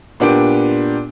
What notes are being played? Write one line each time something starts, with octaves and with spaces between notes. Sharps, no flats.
A#2 B3 D4 G4 D7